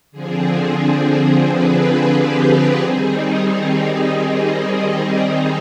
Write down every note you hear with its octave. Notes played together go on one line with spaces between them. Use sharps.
D3 F3 C4 G#4
G#4
B4
G#4
G4
D#3 G3 C4 D#4 G#4